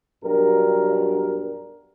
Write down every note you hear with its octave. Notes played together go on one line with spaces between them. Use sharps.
B1 G2 A#4